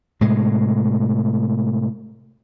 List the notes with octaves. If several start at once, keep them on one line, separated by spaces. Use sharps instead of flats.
A2 C3 G#3